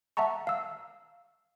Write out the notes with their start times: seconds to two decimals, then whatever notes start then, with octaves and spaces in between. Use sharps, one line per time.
0.17 E5 F#5 A5 A#5 C#6
0.47 F5 E6